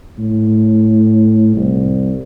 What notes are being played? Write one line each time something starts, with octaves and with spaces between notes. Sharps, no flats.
A2
C2